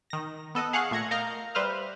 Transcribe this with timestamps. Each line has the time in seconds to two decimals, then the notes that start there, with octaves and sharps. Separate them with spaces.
0.10 D#3 A#6
0.55 B3 A4 D#5 F#6
0.73 G#4 F5 F#5 C#6 F#6
0.91 A#2 A3 G#6 A#6 C#7
1.11 A#4 D#5 F5 A#5 F6 G6
1.55 G3 B4 C5 E5 F6